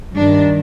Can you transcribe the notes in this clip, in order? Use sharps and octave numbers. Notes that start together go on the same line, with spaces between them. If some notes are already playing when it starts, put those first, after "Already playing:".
G2 D#3 D4